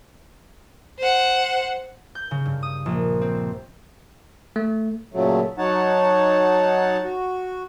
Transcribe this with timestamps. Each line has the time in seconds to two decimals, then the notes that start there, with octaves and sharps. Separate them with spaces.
0.99 C5 F#5
2.15 G6
2.31 C#3
2.45 G2
2.63 D#6
2.86 A#1
3.21 C4
4.56 A3
5.14 A#2 C#3 F#3 A3
5.58 F#3 D#4 C#5 F#5 A5
7.04 F#4